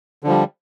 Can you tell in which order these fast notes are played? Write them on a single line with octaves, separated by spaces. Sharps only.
D3 F3 G3